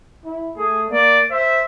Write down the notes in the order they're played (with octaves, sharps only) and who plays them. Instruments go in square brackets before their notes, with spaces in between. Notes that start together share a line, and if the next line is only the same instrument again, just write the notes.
[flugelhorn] E4
[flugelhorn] A3 [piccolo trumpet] G#4
[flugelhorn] A#3 [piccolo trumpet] D5
[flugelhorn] C5 [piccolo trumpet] E5